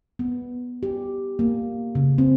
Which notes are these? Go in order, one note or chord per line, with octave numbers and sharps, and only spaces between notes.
B3
G4
A#3
C#3
C4